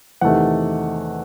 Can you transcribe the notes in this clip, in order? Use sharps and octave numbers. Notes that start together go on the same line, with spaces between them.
E2 C3 D#3 A3 F#5